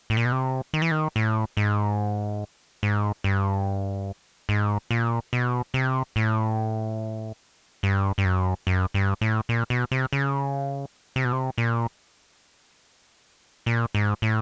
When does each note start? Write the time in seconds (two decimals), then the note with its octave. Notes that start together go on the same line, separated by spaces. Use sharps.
0.10 A2
0.17 A#2
0.25 B2
0.32 C3
0.74 D#3
0.82 E3
0.91 D#3
1.16 A2
1.57 G#2
2.83 G#2
3.24 G2
4.49 G#2
4.91 A#2
5.33 B2
5.74 C3
6.16 A2
7.83 G2
8.18 G2
8.25 F#2
8.67 F#2
8.94 G2
9.21 A2
9.49 A#2
9.70 B2
9.92 C3
10.13 C#3
11.16 C3
11.25 B2
11.32 C3
11.58 A#2
13.66 A#2
13.95 G#2
14.22 A2